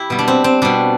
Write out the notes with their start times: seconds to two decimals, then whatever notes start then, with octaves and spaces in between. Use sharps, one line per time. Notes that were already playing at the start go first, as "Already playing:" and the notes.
Already playing: E4 G4
0.10 B2 G3
0.19 D4
0.28 C4
0.44 C4
0.62 B2 G3 D4